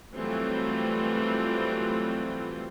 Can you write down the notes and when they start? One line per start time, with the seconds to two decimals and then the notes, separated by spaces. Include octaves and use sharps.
0.14 E3 F#3 G3 A3 C4 F4